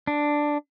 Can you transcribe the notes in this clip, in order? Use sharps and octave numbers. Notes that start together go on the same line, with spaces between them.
D4